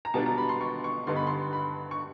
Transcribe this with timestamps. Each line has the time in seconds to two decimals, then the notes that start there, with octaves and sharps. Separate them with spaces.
0.05 A#5
0.14 B2 G3 B3 D4 F4 A5
0.26 A#5
0.38 B5
0.49 C6
0.61 C#6
0.84 C#6
1.07 G2 D3 G3 B3 D#4 C6
1.16 B5
1.27 C6
1.53 B5
1.91 C#6